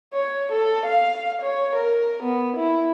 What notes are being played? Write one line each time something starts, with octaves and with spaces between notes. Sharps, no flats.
C#5
A4
F5
C#5
A#4
B3
E4